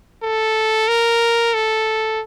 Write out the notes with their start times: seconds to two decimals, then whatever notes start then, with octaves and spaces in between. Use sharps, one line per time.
0.22 A4
0.88 A#4
1.54 A4